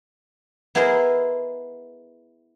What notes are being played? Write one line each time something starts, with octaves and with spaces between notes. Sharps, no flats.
B3 E4 G#4 A#4 C5 D#5